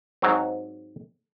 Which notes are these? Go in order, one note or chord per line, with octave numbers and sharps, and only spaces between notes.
G#2 F#3 C4